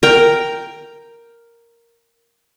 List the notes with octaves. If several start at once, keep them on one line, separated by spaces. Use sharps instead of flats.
A#4 G5